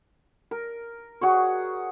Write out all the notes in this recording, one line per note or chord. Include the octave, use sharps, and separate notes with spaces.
A#4
F#4 G#4 C#5